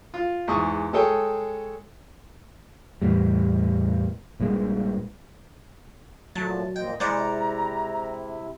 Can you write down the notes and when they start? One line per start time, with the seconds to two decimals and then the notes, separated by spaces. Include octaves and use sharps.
0.14 F4
0.48 E2 G#2 C#6 D#6
0.93 G#3 G#4 A4 C#5 G5
3.02 E2 A2 G3
4.40 A#1 G2 A#2 G#3
6.36 A#2 F3 F#3 A3 A5
6.76 A#2 A#3 C4 D#5 G5
7.00 C3 G#3 E4 C5 D5 F#5 A#5